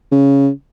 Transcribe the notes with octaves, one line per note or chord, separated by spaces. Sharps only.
C#3